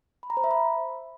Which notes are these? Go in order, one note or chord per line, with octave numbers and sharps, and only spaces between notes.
B5
A#5
C5
E5
B5